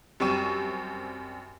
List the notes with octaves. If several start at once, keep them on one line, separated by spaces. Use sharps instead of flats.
F#2 G3 C4 C#6 D#7 E7